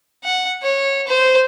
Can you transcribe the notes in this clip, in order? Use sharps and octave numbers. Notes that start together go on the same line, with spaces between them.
F#5
C#5
C5